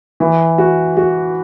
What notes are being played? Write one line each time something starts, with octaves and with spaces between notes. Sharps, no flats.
E3
F#4
F#4